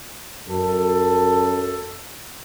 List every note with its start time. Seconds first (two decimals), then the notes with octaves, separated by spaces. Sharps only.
0.48 F#2 A4